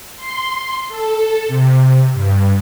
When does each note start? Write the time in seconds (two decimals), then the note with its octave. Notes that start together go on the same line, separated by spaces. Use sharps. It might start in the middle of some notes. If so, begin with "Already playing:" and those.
0.16 C6
0.88 A4
1.48 C3
2.14 G2